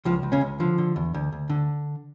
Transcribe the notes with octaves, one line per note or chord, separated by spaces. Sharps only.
C#2 F3
C#2
C#3 C#4
C#2
D3 F3
D3
E2
D2
D2
D3